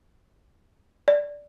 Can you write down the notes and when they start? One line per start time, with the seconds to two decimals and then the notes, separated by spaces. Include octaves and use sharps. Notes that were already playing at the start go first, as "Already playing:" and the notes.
1.08 D5